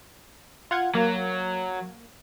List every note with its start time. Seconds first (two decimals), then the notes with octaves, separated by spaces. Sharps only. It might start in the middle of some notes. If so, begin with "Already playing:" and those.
0.71 F4 F#5 G#6
0.95 F#3 A#3